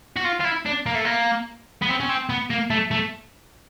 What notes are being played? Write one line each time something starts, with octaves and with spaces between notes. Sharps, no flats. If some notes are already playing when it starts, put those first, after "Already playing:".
F#4
F4
F4
E4
D4
A#3
A3
A#3
B3
C4
C#4
C4
B3
A#3
A3
A3